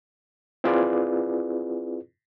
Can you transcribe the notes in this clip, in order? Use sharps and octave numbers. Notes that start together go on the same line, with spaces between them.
C4 E4 F4 G#4 B4 D5